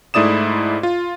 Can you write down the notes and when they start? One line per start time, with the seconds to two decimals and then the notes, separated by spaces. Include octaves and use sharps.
0.14 G#2 A3 E4 D5 D#6 E7
0.83 F4